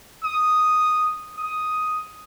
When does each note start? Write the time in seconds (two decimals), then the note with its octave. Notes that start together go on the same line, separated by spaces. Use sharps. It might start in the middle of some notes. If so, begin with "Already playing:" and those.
0.24 D#6
1.38 D#6